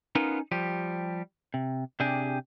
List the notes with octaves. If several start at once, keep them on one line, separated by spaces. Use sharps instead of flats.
B3 C#4 D#4 F4 A#4 B4
F3 G3 G4
C3
C3 D4 G4 G#4